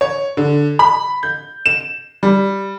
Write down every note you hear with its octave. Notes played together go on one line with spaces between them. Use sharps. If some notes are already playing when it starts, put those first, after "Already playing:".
C#5
D3
B5
G6
E7
G3